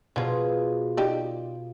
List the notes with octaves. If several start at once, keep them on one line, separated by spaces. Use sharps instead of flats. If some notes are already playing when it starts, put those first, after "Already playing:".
B2 F3 F#3 F4 G#4
D#4 G4 D5